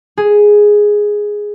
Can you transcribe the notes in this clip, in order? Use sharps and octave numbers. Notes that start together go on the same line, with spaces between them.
G#4